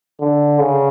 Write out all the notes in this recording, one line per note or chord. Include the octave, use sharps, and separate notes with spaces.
D3
C#3